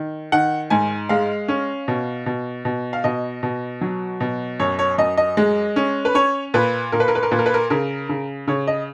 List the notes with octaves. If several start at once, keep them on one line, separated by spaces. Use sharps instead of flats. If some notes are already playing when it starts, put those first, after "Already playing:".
Already playing: D#3
D#3 F#5
G#2 G#5
G#3 F5
C#4
B2
B2
B2
F5
B2 D#5
B2
F#3
B2
F#2 C#5
C#5
F#2 D#5
D#5
G#3
C#4
B4
C#4 C#5
A#2 B4
A#2 A#4
B4
A#4
B4
A#4
A#2 B4
A#4
B4
A#4
C#3 A#4
C#3
C#3 C#5
D#5